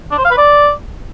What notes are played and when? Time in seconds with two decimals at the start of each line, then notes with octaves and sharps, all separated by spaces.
0.12 D4
0.18 C5
0.25 F5
0.31 B4
0.38 D5